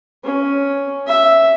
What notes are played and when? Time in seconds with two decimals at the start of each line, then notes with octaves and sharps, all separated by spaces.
0.24 C#4
1.07 E5